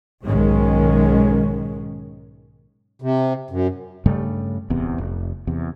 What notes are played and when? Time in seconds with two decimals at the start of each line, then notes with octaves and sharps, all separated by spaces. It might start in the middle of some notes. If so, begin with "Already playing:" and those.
0.24 B1 G#2 D#3 G#3 C#4
3.02 C3
3.50 F#2
4.06 G2 C#3 G3 A3
4.70 D1 E2 C3 B3
4.98 F1
5.47 E2 C3